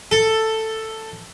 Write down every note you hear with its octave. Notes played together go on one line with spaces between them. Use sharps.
A4